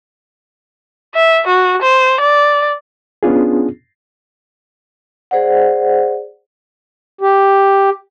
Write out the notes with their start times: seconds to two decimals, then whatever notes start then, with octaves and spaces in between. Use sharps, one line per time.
1.15 E5
1.47 F#4
1.82 C5
2.21 D5
3.23 B3 C#4 D4 F4 G#4
5.31 G#4 C5 D5 F#5
7.21 G4